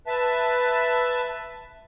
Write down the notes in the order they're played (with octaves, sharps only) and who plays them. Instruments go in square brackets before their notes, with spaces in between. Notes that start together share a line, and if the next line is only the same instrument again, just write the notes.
[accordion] B4 E5 A5